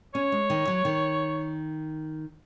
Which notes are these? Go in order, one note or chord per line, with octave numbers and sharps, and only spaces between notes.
C#4 C#5
G#3
D#3
F#3
D#3